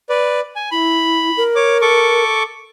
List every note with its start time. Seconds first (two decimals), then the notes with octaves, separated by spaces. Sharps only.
0.09 B4 D5
0.56 G#5
0.71 E4 B5
1.36 A#4
1.55 C#5 D6
1.82 A4 C#6 D6